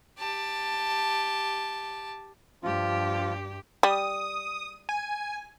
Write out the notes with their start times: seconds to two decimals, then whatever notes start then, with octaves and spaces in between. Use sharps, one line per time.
0.19 G4 A5
2.63 G2 F3 F4 G4
3.83 G3 D#6
4.89 G#5